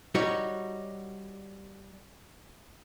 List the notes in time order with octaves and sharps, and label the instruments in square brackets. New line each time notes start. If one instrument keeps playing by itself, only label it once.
[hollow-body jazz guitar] G3 D#4 F#4 C#5